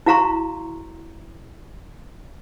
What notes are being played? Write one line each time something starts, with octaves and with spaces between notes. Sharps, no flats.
E4 F#4 F5 A#5 C6 C#6